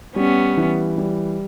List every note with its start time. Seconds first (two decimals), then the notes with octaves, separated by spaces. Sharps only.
0.16 G3 B3 C#4
0.57 E3
0.98 G3